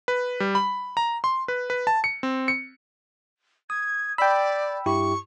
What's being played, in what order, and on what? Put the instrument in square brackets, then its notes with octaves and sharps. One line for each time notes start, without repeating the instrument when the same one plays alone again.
[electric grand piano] B4
G3
B5
A#5
C6
B4
B4
A5
C#7
C4
C#7
[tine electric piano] D#6 [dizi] G#6
[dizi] D5 [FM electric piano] G5 B5 [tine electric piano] E6
[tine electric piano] G2 E4 G4 [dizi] C#6